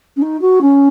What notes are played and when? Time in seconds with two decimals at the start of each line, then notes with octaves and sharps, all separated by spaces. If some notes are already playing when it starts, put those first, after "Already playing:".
0.16 C#4
0.22 D#4
0.42 F#4
0.61 C#4